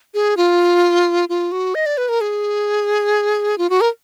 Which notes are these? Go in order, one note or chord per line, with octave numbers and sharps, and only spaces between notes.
G#4
F4
F4
F#4
D#5
D5
B4
A#4
G#4
F4
F#4
A#4